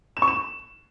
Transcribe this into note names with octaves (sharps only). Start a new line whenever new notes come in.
E7
C#6
E7